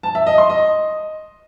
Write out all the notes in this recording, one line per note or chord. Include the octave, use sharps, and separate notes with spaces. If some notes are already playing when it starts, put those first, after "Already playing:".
A5
E5
D#5
C6
D#5